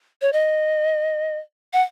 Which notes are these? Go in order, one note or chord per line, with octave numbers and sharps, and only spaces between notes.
C#5
D#5
F#5